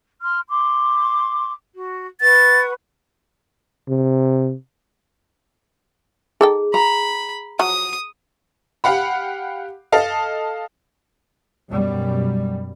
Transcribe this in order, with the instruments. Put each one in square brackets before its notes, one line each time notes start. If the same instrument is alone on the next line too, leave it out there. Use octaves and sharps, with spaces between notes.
[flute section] C6 F6
C6 D6
F#4
[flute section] B4 F#5 C#6 [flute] A6
[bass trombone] C3
[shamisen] D#4 A4 G5 [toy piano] G#4
[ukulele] A#5 [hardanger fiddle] B5
[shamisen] F3 F#3 F#4 [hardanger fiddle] D#6
[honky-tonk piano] G4 F5 F#5 B5
A4 D#5 F5 A5
[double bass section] F#2 B2 G3